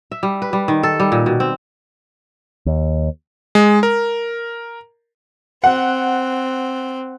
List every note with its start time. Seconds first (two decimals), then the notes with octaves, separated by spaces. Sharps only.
0.12 E5
0.23 G3
0.42 B4
0.53 G3
0.68 D#3
0.83 A4
1.00 G3
1.12 A#2
1.26 B2
1.40 C4
2.66 D#2
3.55 G#3
3.83 A#4
5.64 C4 F#5